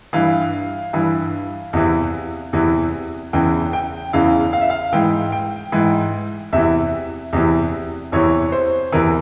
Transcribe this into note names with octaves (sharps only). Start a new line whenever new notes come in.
G2 E3 F5
G2 E3
E2 C3 E3
E2 C3 E3
E2 C#3 E3 G5
G5
E2 C#3 E3 F5
F5
E5
F5
G#2 E3 G5
G5
G#2 E3
E2 C3 E3 E5
E2 C3 E3
E2 C3 E3 C#5
C5
E2 C3 E3 A#4